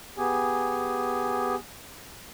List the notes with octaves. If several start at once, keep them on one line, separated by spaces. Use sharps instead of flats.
B3 G4 G#4 G#5